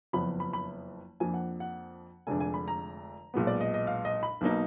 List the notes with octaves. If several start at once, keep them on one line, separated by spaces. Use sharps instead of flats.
F#1 F2 F3 B3 B5
B5
B5
F2 F3 A#3 D4 G#5
F#5
F#5
F1 F2 D3 G#3 D4 G#5
G#5
B5
A#5
B1 A#2 G#3 B3
D5
D#5
D#5
F5
D#5
B5
B1 B2 A#3 D#4